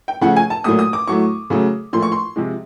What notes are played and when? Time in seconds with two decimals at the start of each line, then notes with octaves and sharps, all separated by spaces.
0.08 G5
0.21 C#3 F3 A3 F#5
0.36 G#5
0.50 A5
0.64 A#2 F#3 A3 D#6
0.79 D#6
0.93 D6
1.08 A2 F#3 A3 C#6
1.50 C#3 F#3 A3
1.93 A#2 F3 A3 C6
2.02 C#6
2.12 C6
2.36 C3 F3 G#3